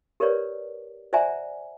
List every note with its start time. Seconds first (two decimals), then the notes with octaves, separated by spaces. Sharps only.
0.20 G4 A#4 B4 C#5 D5
1.13 C5 D5 E5 F#5 G#5 A#5